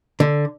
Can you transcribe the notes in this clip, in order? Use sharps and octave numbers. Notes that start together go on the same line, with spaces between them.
D3